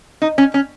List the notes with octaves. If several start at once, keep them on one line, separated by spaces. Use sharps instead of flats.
D#4
C#4
C#4